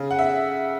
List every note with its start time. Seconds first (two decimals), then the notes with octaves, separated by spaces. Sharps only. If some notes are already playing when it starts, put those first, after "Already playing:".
Already playing: C#3
0.11 F#5
0.19 E5